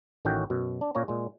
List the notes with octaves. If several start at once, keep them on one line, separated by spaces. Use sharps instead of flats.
A1 A2 D#3 C#4 F#4 G5
F#2 B2
D4
A#2 A#3 C#4 C#5 A#5
A#2 G#3